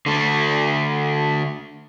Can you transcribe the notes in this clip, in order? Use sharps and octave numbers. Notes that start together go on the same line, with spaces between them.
D3 A3